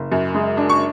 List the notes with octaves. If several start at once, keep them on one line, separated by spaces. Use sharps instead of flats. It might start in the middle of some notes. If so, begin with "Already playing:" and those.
Already playing: F#1
F#2
G#3
D4
C#6